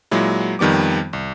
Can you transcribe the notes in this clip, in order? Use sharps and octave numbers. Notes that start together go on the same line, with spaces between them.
A#2 F#3 G#3 E4
F2 D#3 G3 B3 D6
C2